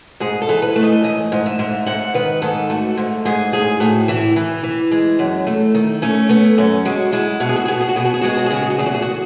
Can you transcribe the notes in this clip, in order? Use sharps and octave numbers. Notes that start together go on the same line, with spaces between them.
G#2 G#4
A4
E3
B4
A3
D#5
G#2 D#5
G#2
E5
G#2
G#2 F#5
D#3 B4
G#2 A4
A3 F#4
G#2
G#2 G#4
A2 G#4
A2 F#4
E3 E4
E3
E3
G#3
F#2
A3
D#3
A3 C#4
A3 B3
F#2 C#4
G#3 F#4
G#3 E4
B2 F#4
G#4
F#4
G#4
B2 F#4
G#4
F#4
B2 G#4
F#4
G#4
G#3 F#4
G#4
F#4
G#4
C#3 F#4
G#4
F#4
E2 G#4
F#4
G#4
F#4